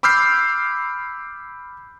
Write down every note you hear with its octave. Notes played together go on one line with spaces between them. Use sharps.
B5 D6 E6 F6 G6 C7